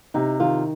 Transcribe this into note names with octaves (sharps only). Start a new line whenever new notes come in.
C3 D#4
D#3 F4